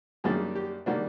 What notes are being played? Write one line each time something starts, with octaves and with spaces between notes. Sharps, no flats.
F#2 D#3 G3 A#3 D4 G#4
G4
D#3 G3 A#3 D4 F#4